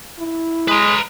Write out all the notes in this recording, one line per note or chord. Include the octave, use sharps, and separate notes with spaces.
E4
G#3 B4 A#5